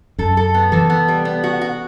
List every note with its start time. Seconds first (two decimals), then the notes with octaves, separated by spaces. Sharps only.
0.19 F#2 A4
0.37 A4
0.54 B3
0.72 E3 A4
0.90 B3
1.08 G3
1.25 B3
1.44 F#4
1.61 F#4